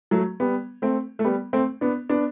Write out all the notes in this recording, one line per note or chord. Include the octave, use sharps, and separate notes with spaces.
F#3 A3
G3 B3
A3 C4
A3
G3 B3
A3 C4
B3 D4
B3 D4